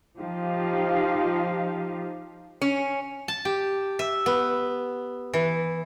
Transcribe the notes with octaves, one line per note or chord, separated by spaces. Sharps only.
F3 D#4 G4 F5
C#4
A5
G4
E5
B3
E3